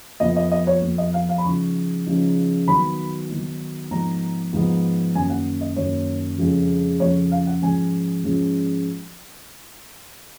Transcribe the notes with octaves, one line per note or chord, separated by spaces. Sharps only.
F2 F3 B3 D#5
D#5
D#5
C#5
F2 F3 B3
D#5
F5
F5
B5
C#3 F3 G#3 D#4 C#6
C#3 F3 G#3 D#4
D#3 F#3 B3 D#4 B5
D#3 F#3 B3 D#4
G#2 F3 B3 D#4 A#5
G#2 F3 B3 D#4
F#2 D#3 A#3 C#4 G#5
F#5
D#5
F#2 D#3 A#3 C#4 C#5
F2 C#3 G#3
F2 C#3 G#3 C#5
F5
F#5
G#2 F3 G#3 C#4 G#5
G#2 F3 G#3 C#4